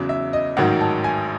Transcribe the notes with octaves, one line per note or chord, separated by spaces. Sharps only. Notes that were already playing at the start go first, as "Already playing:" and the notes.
Already playing: E2 C#3 F#3
E5
D#5
A1 G#2 D#3 F#3 F#5
A5
G#5